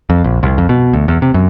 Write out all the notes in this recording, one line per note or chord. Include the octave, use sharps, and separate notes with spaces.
F2
A#1
C2
F2
B2
D2
E2
C3
F#2